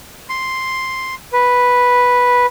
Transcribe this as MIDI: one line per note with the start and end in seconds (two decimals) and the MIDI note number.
0.30 1.15 84
1.33 2.46 71